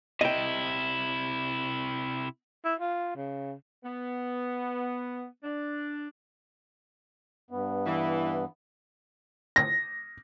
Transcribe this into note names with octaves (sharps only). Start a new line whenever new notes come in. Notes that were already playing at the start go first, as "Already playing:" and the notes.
C3 E4 D#5 G5
E4
F4
C#3
B3
D4
G2 B3
E3
A#6